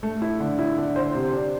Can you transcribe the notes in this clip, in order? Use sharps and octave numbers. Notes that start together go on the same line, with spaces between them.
A3
E4
D3
E4
D3
C5
C3
D4